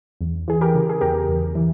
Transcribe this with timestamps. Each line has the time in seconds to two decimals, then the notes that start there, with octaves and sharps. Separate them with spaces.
0.21 E2
0.48 E3 G#4
0.61 G4 A#4
0.75 C#3
0.89 G#4
1.01 E2 G4 A#4
1.28 E2
1.55 E3